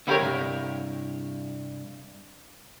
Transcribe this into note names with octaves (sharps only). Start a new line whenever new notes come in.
D3 B3 E4 G4 A#4 C#5
C2 G2